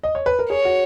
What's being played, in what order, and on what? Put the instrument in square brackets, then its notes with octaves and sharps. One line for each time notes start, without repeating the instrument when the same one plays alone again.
[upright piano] D#5
C#5
B4
A#4
[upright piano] G#4 [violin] C#5
[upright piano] F#4